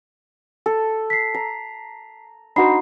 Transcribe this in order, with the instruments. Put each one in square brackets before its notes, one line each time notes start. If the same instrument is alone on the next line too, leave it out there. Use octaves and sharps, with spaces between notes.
[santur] A4
[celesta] B6 C7
[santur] A#5
[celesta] D4 B5 C7 [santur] D#4 F#4 C5